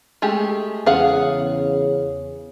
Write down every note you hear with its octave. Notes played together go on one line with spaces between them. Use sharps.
G#3 A3 G4
E2 C#3 G#4 F5 F#5